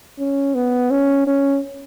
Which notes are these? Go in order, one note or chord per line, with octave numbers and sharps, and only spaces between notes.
C#4
B3
C#4
C#4